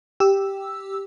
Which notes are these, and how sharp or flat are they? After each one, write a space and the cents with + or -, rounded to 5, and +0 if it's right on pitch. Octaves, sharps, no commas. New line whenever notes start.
G4 +0 E6 +0